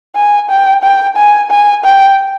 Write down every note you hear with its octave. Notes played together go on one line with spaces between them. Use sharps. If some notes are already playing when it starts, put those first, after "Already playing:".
G#5
G5
G5
G#5
G#5
G5